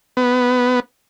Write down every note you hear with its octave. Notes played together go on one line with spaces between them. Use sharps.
B3